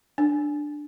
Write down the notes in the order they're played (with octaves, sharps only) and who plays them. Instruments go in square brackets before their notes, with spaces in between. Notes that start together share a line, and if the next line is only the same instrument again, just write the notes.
[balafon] D4